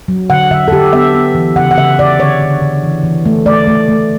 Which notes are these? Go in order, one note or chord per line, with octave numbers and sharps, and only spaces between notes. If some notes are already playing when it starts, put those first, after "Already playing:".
F#3
D3 F#5
D3 E5
A4
D3 G4
B3 E5
B3
E3
C#3 F#5
F#5
C#3 E5
C#3 D5
D3 C#5
D3
D3
E3
E3
A3
A3 D5
A3
A3